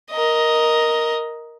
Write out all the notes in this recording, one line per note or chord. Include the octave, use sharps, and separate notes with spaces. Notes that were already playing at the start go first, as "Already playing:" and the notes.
A#4 D#5